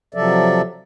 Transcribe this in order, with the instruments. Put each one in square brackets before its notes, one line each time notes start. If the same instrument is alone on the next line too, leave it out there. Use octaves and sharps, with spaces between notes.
[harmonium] C3 F3 F#3 A4 D5 E5